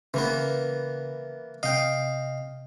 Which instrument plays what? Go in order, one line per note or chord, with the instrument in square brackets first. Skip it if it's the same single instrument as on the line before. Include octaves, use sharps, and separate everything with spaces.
[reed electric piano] C#3 [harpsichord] E3 A#3 B3
[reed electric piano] C3 D#5 [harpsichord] F5 G5